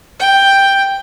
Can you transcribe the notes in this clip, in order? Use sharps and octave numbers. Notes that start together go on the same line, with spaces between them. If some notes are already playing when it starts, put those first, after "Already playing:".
G5